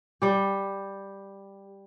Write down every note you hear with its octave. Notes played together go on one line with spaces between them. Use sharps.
G3 G4